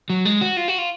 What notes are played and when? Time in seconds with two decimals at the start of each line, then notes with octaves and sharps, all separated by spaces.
0.10 F#3
0.25 G#3
0.41 F#4
0.57 F4
0.68 F#4
0.78 F4